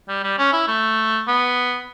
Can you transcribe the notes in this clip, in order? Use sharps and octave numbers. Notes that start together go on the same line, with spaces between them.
G3
G3
C#4
E4
A3
B3